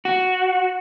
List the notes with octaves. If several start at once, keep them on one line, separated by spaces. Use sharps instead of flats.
F#4